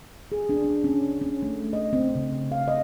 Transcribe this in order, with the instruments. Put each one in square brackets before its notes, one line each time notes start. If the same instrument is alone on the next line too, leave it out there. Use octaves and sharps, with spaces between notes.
[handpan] G#4
D4
D4
C#4
C#4
A3
D#5
C4
C#3
F5
D#5